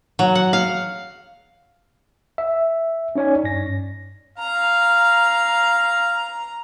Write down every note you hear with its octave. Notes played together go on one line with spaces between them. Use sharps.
F#3
F#5
F5
E5
C#4 D#4 C#5 D5 G#5
G2 A#6
F5 A#5